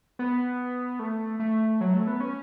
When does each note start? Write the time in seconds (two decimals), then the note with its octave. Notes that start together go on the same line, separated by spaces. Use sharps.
0.19 B3
0.99 A3
1.40 A3
1.81 F#3
1.94 A3
2.07 B3
2.20 C#4